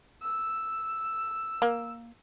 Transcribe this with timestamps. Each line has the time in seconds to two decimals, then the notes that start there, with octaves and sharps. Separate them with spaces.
0.23 E6
1.62 A#3